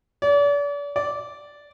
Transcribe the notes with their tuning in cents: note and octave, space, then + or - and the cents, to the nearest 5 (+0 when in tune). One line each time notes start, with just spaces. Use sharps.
D5 -40
D5 -10